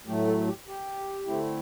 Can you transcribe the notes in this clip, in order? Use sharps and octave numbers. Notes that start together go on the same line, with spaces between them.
A2 F#3 A3 G4
A4
G4
G4
D3 A3 C4 E4